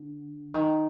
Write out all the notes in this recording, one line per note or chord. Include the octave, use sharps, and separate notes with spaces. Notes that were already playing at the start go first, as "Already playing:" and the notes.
Already playing: D3
D#3